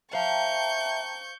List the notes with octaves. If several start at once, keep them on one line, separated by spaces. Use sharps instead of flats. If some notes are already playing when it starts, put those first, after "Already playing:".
C5 E5 F5 G5 A5 A#5 C#6 G6